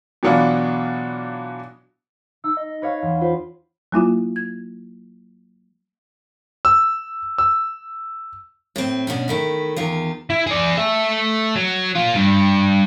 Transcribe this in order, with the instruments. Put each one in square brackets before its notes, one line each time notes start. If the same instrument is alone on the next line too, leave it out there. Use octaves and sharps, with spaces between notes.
[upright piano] B2 E3 F#3 B3 D4 F4
[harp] D#4 [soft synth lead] E6
[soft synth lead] D#5
[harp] B4 C#5 F5
E2 C6
[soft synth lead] F4 [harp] B4 C5
[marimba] F#3 A#3 E4 F4
G#6
[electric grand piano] E6
E6
[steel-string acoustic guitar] A2 C4
B2 C#4 D4
D#3 A3 E4
E2 D#3 F4
[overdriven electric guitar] E4
G#4 D5
A4 E5
F#3
A#2 F4
G2